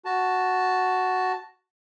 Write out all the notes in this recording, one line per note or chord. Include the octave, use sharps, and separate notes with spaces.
F#4 A5